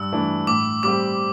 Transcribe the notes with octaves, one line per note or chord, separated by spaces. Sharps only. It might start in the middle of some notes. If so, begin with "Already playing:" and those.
Already playing: G2 E6
E3 A3 D4
A2 D6
G3 C4 G4 D6